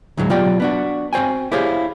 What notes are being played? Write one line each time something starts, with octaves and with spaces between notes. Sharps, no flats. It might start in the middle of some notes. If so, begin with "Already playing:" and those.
D2 A2 F#3 G#3
B2 F#3 F4 G4 D5 G5
B3 D4 F#4
C4 F#4 C5 G5 G#5
E4 G4 G#4 C5 C#5 F5